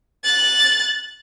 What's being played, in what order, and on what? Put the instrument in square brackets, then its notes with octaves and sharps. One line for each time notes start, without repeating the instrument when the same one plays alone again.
[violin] F#6 A6